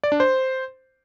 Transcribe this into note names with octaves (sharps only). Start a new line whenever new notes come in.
D5
D4
C5